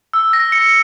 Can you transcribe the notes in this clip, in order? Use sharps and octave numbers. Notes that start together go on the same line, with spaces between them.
E6
A#6
C#7